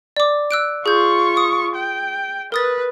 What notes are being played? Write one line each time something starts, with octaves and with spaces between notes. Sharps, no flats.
D5 D6
E6 F#6 D7
F4 G#4 C#6 G6
D#6
G5
A#4 B4 D#6 A6